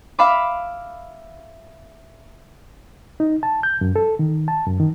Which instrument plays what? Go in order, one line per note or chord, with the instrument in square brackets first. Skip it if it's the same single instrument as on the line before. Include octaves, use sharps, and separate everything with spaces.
[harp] E5 F5 B5 D6
[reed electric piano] D#4
A5
G6
F#2
A4
D#3
A5
F#2
D#3